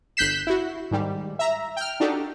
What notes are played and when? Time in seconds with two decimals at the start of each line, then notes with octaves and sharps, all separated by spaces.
0.17 G1 F#6 G6 B6 C7 E7
0.47 E4 F#4
0.91 G#2 D#3 G3
1.39 E5 A#5
1.77 G5 F6
2.00 D4 D#4 F#4 G4 A4